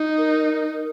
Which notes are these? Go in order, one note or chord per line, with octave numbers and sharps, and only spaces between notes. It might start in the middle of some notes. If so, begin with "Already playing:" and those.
Already playing: D#4
A#4